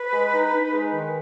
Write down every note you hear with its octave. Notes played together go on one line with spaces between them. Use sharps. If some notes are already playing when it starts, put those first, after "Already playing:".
Already playing: B4
G#3
D#4
D#4
G#3
D#3